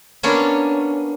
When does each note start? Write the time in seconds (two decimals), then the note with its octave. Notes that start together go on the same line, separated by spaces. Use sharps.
0.23 A#3 B3 C#4 D4 C#5